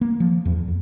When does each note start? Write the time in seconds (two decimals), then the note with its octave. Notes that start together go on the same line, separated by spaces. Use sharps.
0.01 A#3
0.20 F3
0.45 E2
0.68 F2